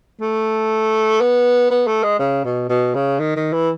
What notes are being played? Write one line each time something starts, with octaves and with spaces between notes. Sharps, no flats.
A3
B3
B3
A3
G#3
C#3
B2
B2
C#3
D#3
D#3
E3